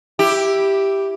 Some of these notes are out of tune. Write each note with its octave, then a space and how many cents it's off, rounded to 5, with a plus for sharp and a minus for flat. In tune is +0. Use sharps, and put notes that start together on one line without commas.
E4 +0 G4 +0